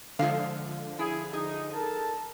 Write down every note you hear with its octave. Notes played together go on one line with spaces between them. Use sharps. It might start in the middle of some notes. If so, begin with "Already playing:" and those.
D3 F3 G#3 F5
E4 G#4
D#4 G#4
A4 A#4 A5